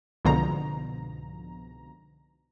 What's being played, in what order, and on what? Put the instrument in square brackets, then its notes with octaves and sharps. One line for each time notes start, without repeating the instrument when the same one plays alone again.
[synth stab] C2 G#2 B2 D3 F3 A#5